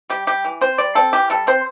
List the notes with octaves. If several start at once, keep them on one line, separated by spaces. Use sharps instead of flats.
G3 G4
G3 G4
E3
C4 C5
G3 D5
C4 A4
E3 G4
G3 A4
C4 C5